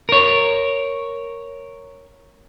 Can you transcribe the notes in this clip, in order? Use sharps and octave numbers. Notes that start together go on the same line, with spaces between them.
A#4 C#5